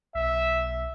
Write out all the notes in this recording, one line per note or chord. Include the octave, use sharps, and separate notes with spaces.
B1 E5